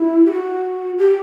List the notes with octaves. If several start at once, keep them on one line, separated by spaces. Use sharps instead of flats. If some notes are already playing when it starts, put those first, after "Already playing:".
Already playing: E4
G4
F#4
G4